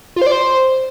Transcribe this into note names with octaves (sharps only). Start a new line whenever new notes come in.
F4
C5
D5
C5